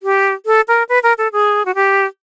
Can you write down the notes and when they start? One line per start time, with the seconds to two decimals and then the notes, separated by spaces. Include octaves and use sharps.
0.03 G4
0.46 A4
0.68 A#4
0.89 B4
1.03 A#4
1.18 A4
1.32 G#4
1.65 F#4
1.75 G4